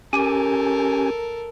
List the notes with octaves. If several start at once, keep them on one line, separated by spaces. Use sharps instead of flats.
C#4 G4 A4 A#4 G#5